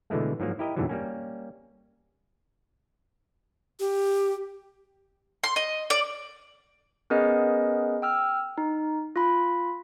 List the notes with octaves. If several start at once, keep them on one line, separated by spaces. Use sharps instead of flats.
B2 D3 E3 G#3 A3
G#2 F3 F#3 A#3
E4 G4 A#4 D#5
F2 G#2 B2 D3 E3 F#3
G3 A#3 C#4
G4
C6
D#5
D5
B3 C#4 G#4 A#4 B4 D#5
G5 E6 F6
D#4
F4 B5